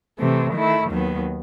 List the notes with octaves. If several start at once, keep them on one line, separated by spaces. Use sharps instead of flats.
C3 E3 A3
D#3 A3 E4
D#2 D#3 F#3 B3